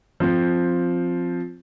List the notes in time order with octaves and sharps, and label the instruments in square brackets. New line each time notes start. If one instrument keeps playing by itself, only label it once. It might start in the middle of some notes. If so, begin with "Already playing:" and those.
[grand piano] F3 C4